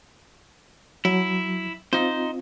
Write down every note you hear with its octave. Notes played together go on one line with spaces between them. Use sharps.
F#3 E4
C4 D#4 F4 C5